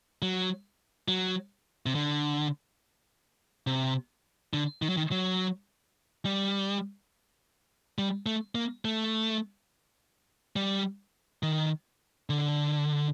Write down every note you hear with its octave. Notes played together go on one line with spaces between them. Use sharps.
F#3
F#3
C3
D3
C3
D3
D#3
F#3
D#3
F#3
G3
G3
A3
A#3
A3
G3
D#3
D3